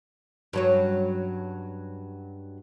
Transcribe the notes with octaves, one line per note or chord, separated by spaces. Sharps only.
G2 F#3 C#4